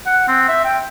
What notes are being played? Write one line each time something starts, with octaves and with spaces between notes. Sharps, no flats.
F#5
C4
E5
G5